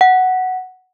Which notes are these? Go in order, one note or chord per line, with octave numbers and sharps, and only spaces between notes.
F#5